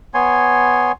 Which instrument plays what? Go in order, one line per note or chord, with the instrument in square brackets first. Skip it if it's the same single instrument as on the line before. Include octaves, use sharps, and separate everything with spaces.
[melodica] B3 C#5 G#5 C6